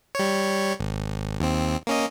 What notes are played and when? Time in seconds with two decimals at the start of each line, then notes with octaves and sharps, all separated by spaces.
0.15 G3 C#5
0.80 G#1
1.40 D#2 C4
1.87 A#3 C#4 D#5